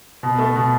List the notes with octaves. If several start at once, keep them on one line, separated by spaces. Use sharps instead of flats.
B2
A3
B2